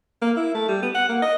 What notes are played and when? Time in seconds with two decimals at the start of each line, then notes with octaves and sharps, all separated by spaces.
0.21 A#3
0.36 E4
0.54 A3
0.68 G3
0.82 B3
0.94 F#5
1.09 A#3
1.22 D#5